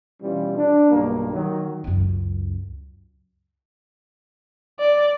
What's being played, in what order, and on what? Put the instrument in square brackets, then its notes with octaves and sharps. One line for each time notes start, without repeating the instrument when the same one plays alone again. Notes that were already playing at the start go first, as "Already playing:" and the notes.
[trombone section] B2 E3 G3 C#4 F4
D4
B1 G2 A#3
D#3 F#3
[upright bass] C#2 F#2
[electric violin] D5